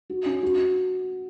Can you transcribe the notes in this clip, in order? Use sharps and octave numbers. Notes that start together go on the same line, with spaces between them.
F#4
C#4
F#4